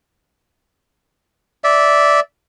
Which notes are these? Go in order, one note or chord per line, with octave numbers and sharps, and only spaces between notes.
D5 E5